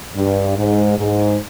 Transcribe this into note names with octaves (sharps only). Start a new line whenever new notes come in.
G2
G#2
G#2